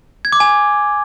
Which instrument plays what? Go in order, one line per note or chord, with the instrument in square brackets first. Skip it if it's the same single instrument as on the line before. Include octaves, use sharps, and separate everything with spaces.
[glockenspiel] G#6
D6
G#5